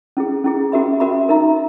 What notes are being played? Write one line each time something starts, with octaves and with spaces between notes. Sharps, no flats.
C#4 E4 G#4
C#4 E4 G#4
C#4 F#4 A#4 E5 B5
C#4 F#4 A#4 E5 B5
D#4 A#4 E5 A#5